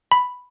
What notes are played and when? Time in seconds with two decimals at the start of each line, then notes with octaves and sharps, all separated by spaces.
0.11 B5